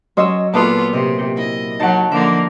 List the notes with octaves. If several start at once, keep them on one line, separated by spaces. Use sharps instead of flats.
F#3 C#4 C5 C#5 D#5 E6
A#2 B3 F4 A4 B4 A5 D6 D#6
C3 D#5
E4 D#5
F#3 D#4 F#5 A5
D3 F3 A#3 E5